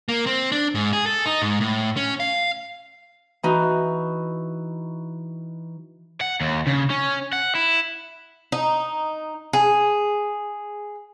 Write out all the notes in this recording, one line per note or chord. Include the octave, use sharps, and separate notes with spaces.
A#3
C4
D4
G#2
G#4
A4
D#4
G#2
A2
C#4
F5
E3 D#4 F#4
F#5
D#2
C#3
C#4
F#5
E4
D#4
G#4